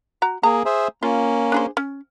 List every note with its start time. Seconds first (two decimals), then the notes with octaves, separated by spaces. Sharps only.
0.22 F#4 A#5
0.43 A#3 G#4 A#5
0.65 G#4 C5 E5
1.03 A#3 C#4 F4
1.52 D4 G#4 C5
1.77 C#4